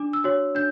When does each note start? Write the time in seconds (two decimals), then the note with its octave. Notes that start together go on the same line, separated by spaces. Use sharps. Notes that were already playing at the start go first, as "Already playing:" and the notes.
Already playing: D4 D6
0.13 E6
0.24 F#4 C#5
0.55 D4 G6